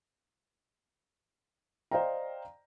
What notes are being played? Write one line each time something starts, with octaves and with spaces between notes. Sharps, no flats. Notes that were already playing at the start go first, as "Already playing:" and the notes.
C5 D5 D#5 F5 G5 A#5